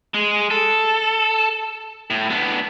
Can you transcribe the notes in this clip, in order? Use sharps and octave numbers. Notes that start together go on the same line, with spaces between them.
G#3
A4
A2
B3 D4